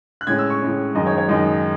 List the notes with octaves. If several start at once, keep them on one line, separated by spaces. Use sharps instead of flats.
F#6
A2 G#3 C#4 G#6
E6
C#6
A2 G#3 C#4
F#2 D#3 G#3 D#4 D#5
C#5
C#5
F#2 D#3 G#3 D#4 D#5